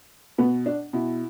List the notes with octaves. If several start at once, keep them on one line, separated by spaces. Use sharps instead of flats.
B2 B3
D4
B2 E4